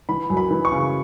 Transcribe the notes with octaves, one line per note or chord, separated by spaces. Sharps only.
E3 B5
F#2
B5
E3
C#6
C#3